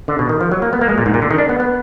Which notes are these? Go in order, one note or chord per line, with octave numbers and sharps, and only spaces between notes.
D3
B2
D#3
F3
F#3
A#3
B3
A#3
G#3
A#2
G#2
A#2
D3
D#3
D4
B3
B3